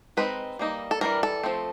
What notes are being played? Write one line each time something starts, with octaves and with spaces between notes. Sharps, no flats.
G#3 C4 D#4 B4
G3 A#3 D#4
A4
E3 G3 A#3 D4 A#4
A4
F3 A3 C4